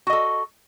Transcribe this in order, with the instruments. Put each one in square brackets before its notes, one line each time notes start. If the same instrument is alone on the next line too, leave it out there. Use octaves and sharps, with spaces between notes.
[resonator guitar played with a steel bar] F#4
D#5
A4